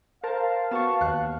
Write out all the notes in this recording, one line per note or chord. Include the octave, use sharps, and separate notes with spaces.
A#4 C5 F5 A5
B3 F#4 A5 C#6
D#2 F#6